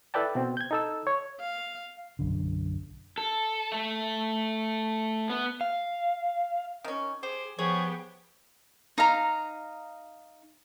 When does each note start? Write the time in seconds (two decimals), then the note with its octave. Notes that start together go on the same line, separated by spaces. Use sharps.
0.14 E4 A4 B4 D5 G5 A5
0.35 B2 C4
0.57 G6 G#6
0.71 D#4 A4 E6
1.07 C#5
1.40 F5
2.19 B1 F#2 D3
3.18 A4
3.72 A3
5.30 B3
5.61 F5
6.84 D#3 C#4
7.23 G4 G#4 C5
7.59 F3 B3 G4 G#4 C#5
8.98 D#4 F5 A#5